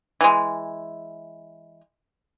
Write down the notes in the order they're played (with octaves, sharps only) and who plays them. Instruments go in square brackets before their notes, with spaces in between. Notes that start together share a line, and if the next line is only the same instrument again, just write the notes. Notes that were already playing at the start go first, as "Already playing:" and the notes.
[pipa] E3 G#3